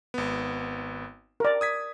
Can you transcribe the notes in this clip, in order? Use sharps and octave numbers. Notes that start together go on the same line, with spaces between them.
G#1 B3
A#4 D5
D#6 G#6 B6